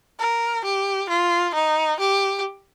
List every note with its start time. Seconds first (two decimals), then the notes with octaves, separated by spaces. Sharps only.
0.20 A#4
0.64 G4
1.09 F4
1.55 D#4
2.00 G4